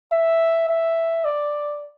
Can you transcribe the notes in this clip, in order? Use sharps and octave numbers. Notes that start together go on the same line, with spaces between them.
E5
E5
D5